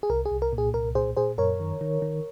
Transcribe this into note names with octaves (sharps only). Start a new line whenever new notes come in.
G#4
C2 A#4
G#4
C2
A#4
A#2
G#4
C2 A#4
A#2 G#4 C5
A#2 G#4 C5
F#2 A#4 C#5
D#3
D#3
D#3